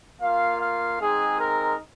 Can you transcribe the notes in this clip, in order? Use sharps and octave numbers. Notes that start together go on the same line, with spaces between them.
A#3 F4 F5
F5
G#3 C4 D#4 G#4
A#4